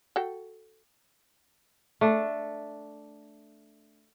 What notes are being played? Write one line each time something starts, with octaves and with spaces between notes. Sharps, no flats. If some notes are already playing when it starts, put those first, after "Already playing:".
F#4 A4 G5
A3 D4